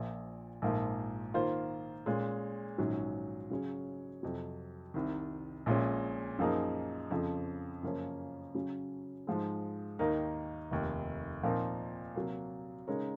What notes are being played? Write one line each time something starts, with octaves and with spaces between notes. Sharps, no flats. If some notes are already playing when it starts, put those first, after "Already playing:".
Already playing: A#1 A#2 F3
A#1 G#2 F3 A#3
D#3 A#3 F4 C5
A#2 G#3 C#4
A#1 G#2 D#3 F#3 C#4
C#3 F#3 C#4 G#4 C#5
F2 C3 F#3
C2 C3 D#3
A#1 A#2 G#3 C#4
F#2 F3 A#3 D#4 G#4
F2 C#3 F3
F#2 C#3 F3 A#3 C#4
C#3 F#3 C#4
G#2 F3 G#3
D#2 D#3 A#3 D#4 A#4
F1 D#2 D#3
A#2 F3 C4 D#4 A#4
C3 F#3 A#3
C#3 G#3 D#4 A#4 C#5